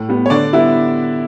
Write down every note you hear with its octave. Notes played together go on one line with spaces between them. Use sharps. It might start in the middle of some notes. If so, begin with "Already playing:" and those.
Already playing: A2
G3 B3
C#5
D3 D4 D5
G3 B3 E4 E5